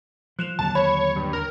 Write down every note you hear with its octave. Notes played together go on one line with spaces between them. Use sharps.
F3 F#6 E7 F7
D#2 D3 F#3 A5
C#5 B5
G2
A#4